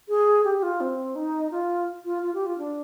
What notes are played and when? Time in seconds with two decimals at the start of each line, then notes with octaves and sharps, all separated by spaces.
0.09 G#4
0.44 G4
0.58 G4
0.63 F4
0.81 C4
1.16 D#4
1.51 F4
2.05 F4
2.23 F4
2.34 G4
2.46 F4
2.59 D4